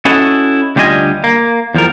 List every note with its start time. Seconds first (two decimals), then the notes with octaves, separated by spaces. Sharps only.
0.05 C#4 E4 F#4 A4 D#5
0.76 D2 G3 D4 F4 D#5 G#5
1.24 A#3
1.75 E2 F3 G3 A#4